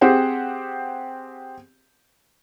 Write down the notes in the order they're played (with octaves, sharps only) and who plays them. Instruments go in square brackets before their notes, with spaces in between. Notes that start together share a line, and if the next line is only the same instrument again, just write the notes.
[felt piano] C4 G4 G#4 C5 F#5